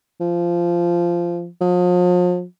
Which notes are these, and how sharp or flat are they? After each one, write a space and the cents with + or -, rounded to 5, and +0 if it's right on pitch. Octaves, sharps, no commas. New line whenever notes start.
F3 -15
F3 +40